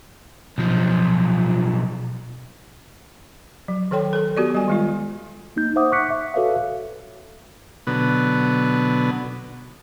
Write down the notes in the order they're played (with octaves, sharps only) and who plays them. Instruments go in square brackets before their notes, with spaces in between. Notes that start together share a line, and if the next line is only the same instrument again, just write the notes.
[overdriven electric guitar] B1 F3
[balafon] F#3
D#3 A4 C#5 G5 C6
A4 A#4
B3 F#4 G4 A#4 D5
G3 G#5
D#3 G#3 F4
[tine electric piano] A#3 D#4 G6
C5 E5 F#5 D6 D#6
C#6 D6 F#6 B6 C#7
E5
F#4 A4 B4 C#5 E5 F5
[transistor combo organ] B2 D3 F#3 B3